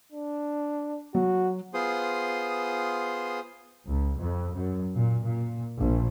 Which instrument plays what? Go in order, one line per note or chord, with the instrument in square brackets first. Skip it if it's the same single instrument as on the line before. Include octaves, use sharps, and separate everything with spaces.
[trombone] D4
[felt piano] F#3 [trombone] F#4
[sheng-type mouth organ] B3 F4 G#4 C5 C6 D#6
[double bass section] C#2
F2
F#2
A#2
A#2
A#1